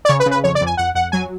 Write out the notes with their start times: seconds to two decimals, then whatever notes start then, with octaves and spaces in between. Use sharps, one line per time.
0.05 D5
0.08 C#3 C#5
0.20 B4
0.26 C#3
0.31 B4
0.44 F2 C#5
0.55 D5
0.61 F2
0.66 G#5
0.77 F2 F#5
0.95 F2 F#5
1.12 F#3 G#5